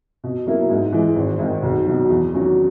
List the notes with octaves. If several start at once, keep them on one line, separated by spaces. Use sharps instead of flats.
B2
F#3 A#3 E4
G#2
E3 G#3
G#1
G#2 D#3
B1
B2 F#3
E2
D#3 F#3 C#4 F#4